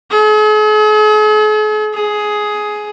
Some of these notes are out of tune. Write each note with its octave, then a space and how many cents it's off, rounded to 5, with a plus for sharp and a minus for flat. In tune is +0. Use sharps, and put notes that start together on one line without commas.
G#4 +45
G#4 +10